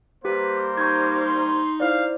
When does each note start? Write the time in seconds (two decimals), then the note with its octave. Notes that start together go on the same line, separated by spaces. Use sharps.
0.25 G3 A#3 G4 B4 C5
0.78 D#4 G4 C#6 G6 G#6
1.20 C6
1.80 E4 C5 D5 F5